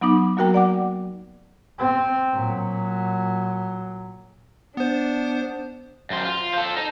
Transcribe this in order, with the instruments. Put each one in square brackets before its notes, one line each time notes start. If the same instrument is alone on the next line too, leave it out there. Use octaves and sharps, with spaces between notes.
[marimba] F#3 B3 D#4 D6
F#3 A#3 F#4 A#4 G5 A#5
D5 F#5 D6
[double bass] C4
A#2 F#3
[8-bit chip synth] B3 C5 [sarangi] D4
[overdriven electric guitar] F#2 C5
F4
A4 C5
D#4